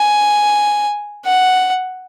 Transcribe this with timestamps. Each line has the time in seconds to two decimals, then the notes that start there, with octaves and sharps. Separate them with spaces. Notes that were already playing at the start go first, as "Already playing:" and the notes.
Already playing: G#5
1.25 F#5